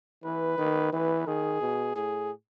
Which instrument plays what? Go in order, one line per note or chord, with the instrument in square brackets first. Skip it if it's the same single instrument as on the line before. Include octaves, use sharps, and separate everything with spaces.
[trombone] E3 [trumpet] B4
[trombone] D#3
[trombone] E3 [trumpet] B4
[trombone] D#3 [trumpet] G#4
[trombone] B2
[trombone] A2 [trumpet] G#4